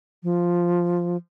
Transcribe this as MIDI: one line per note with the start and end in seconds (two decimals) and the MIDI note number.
0.23 1.17 53